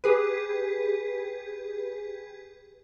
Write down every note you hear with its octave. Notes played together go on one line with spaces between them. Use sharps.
G4 G#4 B4